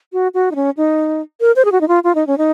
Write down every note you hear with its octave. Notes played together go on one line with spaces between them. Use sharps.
F#4
F#4
D#4
C#4
D#4
A#4
C5
G#4
F#4
D#4
F4
F4
D#4
C#4
D#4